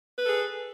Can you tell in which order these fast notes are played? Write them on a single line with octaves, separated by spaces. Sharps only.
B4 A4 G#4